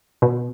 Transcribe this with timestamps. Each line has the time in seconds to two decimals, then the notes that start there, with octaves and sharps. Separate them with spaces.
0.22 B2